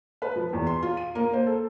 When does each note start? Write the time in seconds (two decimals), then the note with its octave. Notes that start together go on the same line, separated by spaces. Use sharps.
0.22 B4
0.35 F3
0.53 E2
0.67 C6
0.82 F4
0.97 D#7
1.15 A#3
1.33 C5
1.46 A4